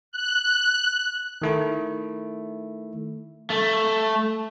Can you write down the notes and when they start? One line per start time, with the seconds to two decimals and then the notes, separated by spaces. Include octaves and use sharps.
0.12 F#6
1.42 D#3 A3 E4
3.50 A3